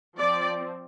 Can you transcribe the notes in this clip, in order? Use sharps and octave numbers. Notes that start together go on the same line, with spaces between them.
F3 C4 D5